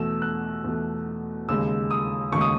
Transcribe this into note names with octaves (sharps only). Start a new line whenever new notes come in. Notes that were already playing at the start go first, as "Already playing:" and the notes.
Already playing: E2 B2 A3 E6
F#6
E2 B2 A3
D#2 C#3 G#3 E6
D#6
D#2 C#3 G#3 C#6
D#6